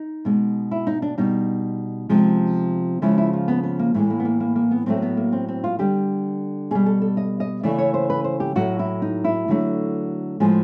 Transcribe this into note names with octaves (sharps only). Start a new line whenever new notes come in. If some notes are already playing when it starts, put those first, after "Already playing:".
Already playing: D#4
B2 G#3
E4
D#4
D4
B2 G3 D#4
C3 F3 G#3
C#3 F3 G#3 E4
E4
F4
B3
B3
A#3
A2 E3 G#3 A3
A#3
B3
A#3
A#3
A#3
B3
A2 F#3 A3 C4
B3
A#3
C4
C4
F4
D3 G3 G4
B2 G3 G#4
A4
A4
D#5
D#5
C#3 E3 A3 D5
C#5
C5
B4
C5
G4
A2 F#3 A3 F#4
E4
D#4
E4
D3 F#3 A3
A2 F3 G#3 G#4